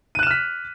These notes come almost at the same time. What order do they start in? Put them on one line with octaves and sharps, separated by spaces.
D#7 F#6 E7 F6 B6